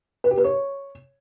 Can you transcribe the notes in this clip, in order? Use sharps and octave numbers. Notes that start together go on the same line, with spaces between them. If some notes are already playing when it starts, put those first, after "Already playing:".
B4
G4
B4
C#5